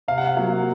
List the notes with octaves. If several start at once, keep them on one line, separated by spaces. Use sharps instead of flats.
C3 F5
F#5
F5
F#3 A#3